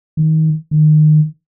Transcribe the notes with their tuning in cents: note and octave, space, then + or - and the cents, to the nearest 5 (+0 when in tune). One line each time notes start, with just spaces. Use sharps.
D#3 +25
D#3 -25